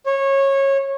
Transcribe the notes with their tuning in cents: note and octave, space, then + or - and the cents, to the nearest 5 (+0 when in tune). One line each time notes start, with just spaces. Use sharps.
C#5 -20